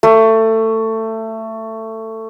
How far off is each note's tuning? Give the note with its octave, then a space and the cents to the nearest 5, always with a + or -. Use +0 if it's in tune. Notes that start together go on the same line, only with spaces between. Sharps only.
A3 +20